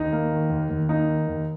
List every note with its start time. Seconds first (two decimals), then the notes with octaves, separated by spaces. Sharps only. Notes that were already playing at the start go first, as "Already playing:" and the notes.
Already playing: D#2 D#4
0.13 A#3
0.32 D#3
0.50 D#2
0.69 D#2
0.89 A#3 D#4
1.08 D#3
1.27 D#2